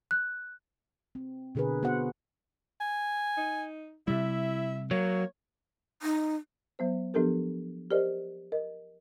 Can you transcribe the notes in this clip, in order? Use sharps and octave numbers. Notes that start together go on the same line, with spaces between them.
F#6
C4
B2 D3 G#4 A#4 B4
B3 F#4 C5 F#5
G#5
D#4
C3 G3 E4 E5
F#3 A#3 C#5
D#4
F#3 B3 C5
F3 B3 D4 G4 A4 A#4
G4 A#4 C5 D5 D#5
A#4 D#5